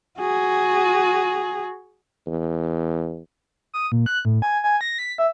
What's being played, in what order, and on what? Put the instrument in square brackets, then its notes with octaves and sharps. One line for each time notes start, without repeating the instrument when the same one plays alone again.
[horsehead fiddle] F#4 G#4
[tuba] E2
[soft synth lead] D#6
A#2
F#6
A2
G#5
G#5
A#6
B6
E5